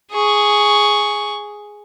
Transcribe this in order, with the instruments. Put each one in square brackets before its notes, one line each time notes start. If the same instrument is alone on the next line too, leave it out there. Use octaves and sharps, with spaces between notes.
[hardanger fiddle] G#4 C#6